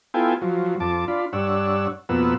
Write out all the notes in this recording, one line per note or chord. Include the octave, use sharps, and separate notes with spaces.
B3 E4 F4 A4 G5 G#5
F3 F#3
F2 A5 D6
D4 F4 B5
G2 D4 C#5 F#5 E6
F2 B2 A#3 B3 F#5 E6